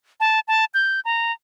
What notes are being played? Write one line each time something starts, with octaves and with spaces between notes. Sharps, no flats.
A5
A5
G6
A#5